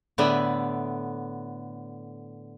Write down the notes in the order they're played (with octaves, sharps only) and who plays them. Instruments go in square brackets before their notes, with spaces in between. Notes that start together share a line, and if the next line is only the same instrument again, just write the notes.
[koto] A2 D3 B3 D5 E5 G#5